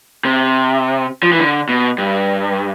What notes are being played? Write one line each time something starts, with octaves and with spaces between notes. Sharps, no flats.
C3
F3
E3
D3
B2
G2